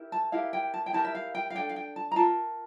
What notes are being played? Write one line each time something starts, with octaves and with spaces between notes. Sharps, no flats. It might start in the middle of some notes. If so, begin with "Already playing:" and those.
Already playing: E4 G4 A#4
A5
E4 G4 A#4 F5
G5
A5
G5
E4 G4 A#4 A5
E5
F5
G5
F5
D4 A4 G5
F5
G5
A5
A#5
F4 A#4 A5